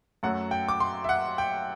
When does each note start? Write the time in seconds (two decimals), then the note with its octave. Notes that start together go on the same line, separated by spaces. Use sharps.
0.23 F#2 F#3 A3 F#5
0.51 G5
0.69 D6
0.80 C6
1.04 E5
1.09 F#5
1.38 G5